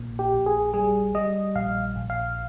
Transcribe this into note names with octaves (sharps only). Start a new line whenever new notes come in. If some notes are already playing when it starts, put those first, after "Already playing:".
Already playing: A#1 A#2
G4
A#1
G#4
G3 G#4
G3 D#5
A#1 F5
A#1
F5